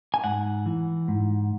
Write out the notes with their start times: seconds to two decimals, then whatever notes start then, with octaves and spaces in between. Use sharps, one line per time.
0.14 G#5
0.24 G#2 F#5
0.66 E3
1.08 G#2